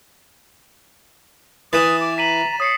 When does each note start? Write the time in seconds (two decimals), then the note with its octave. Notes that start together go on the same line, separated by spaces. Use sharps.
1.73 E3 B4 D#6 A6 E7
2.00 D6
2.18 A#5 B6 D#7 F#7
2.60 C#5 D#6 C7 C#7